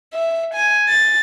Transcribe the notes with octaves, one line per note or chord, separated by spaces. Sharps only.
E5
G#5
A6